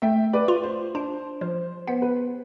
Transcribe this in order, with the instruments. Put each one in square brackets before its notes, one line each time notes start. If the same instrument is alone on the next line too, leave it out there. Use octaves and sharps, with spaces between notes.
[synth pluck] A3 [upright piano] E5 G5
[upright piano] B4 D5
[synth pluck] F4
[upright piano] C5
[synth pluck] D4 [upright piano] C5
[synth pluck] F3 [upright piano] C5
[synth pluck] B3 [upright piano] C5
[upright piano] B4